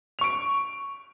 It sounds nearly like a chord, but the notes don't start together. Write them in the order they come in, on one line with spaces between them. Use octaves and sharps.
F7 C#6 D7